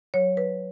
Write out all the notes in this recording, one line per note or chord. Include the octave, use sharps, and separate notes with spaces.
F#3 C#5
B4